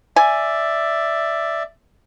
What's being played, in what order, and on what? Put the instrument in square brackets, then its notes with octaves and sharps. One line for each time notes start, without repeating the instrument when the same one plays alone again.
[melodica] D5 E5 [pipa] G#5